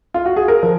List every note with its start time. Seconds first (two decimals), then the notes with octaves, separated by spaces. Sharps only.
0.14 F4
0.26 F#4
0.36 G#4
0.48 A#4
0.63 F3